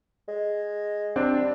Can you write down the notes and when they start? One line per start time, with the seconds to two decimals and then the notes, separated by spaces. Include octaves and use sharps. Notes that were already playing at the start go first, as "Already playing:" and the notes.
0.28 G#3
1.16 G3 C4 D4